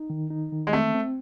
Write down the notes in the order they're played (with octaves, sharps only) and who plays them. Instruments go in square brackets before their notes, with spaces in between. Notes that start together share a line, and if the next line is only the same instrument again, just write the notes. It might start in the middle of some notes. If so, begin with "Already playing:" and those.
Already playing: [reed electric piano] D#4
D#3
D#4
D#3
[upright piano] G#3
[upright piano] A3 [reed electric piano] C4
[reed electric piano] C4